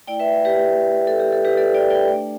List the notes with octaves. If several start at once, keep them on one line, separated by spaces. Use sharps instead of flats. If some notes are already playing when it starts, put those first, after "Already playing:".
A3 E4 D5 G5
B4 E5
G4 B4
A4
G4
A4
G4 B4
A4 D5
D5 G5
D5 G5
A3 D4